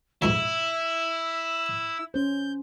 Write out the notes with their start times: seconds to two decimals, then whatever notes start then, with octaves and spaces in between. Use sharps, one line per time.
0.22 F2 G#2 B2 E4 E6
2.14 C#4 C5 G6